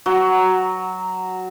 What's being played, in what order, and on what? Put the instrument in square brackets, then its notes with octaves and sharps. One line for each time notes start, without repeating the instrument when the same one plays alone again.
[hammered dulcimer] F#3